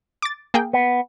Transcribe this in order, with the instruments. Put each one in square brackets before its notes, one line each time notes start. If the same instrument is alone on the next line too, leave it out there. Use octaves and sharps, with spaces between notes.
[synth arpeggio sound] D6 A6
A#3 G#4 G5
[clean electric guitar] B3